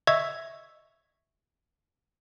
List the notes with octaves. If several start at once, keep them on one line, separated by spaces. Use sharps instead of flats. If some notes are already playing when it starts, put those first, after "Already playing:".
D#5 E5 C#6 E6 G#6